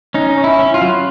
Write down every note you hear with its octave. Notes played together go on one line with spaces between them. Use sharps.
C#4 D#4
C#4
E4
C#4
F4
F#3